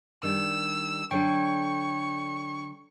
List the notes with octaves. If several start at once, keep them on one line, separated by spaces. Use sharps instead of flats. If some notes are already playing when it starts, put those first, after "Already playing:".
D#3 G3 D4 E6
D3 F#3 D4 A4 C#5 G5 C#6